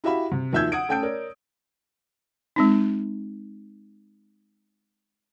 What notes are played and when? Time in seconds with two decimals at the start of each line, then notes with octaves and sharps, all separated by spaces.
0.04 E4 F#4 G4 E5 F5 B5
0.32 C3
0.53 D#2 F3 E5 E6 G6 G#6
0.72 F#5 D#6 G#6 D7
0.89 A3 C#4 G5 A5 G6 D7
1.03 A#4 C#5 D5
2.56 G#3 C4 D#4